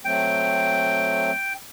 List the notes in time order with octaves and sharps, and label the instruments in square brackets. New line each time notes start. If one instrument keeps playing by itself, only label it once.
[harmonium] F#3 A3 C4 [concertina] G5